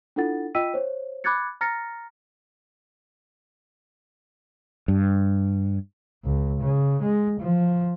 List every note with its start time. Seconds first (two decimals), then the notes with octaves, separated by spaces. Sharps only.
0.16 D4 E4 F4 A4 F#5 A6
0.55 F4 D#5 G5 E6 B6 D#7
0.74 C5 C#5
1.24 B5 D6 F#6 G#6 A6 C#7
1.61 A#5 F6 A6 A#6 C#7
4.88 G2
6.25 C#2
6.61 C#3
7.02 G#3
7.40 F3